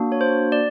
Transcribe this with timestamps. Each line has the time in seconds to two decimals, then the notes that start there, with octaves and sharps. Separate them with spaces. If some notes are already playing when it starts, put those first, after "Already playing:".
Already playing: A#3 D4 F#4
0.12 C#5
0.21 C5
0.52 D5